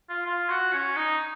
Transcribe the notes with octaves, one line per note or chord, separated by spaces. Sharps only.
F4
F4
F#4
C#4
D#4